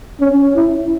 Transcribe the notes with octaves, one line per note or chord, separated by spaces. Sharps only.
C#4
E4